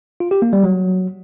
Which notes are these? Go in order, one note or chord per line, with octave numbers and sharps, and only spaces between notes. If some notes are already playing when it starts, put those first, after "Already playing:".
F4
G4
A#3
G3
F#3